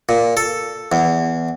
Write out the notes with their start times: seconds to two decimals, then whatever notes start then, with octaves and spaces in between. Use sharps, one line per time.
0.09 A#2
0.37 A4
0.92 E2